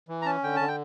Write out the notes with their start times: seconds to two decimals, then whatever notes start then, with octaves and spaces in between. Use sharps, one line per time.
0.08 E3
0.22 A#5
0.26 C#4 A5
0.44 D3 G5
0.56 D3 A5
0.68 G5